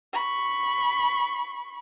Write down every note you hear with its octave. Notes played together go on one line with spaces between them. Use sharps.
B5 C#6